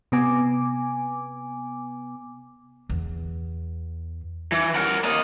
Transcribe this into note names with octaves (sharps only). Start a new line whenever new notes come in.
C3 B3 G#5 D6
E2
E3
A#4 F#5
A#3 D#5